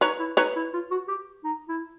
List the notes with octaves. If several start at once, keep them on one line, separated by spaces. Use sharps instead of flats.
D#4 B4 C#5
E4
D#4 B4 C#5
E4
F4
F#4
G4
D#4
E4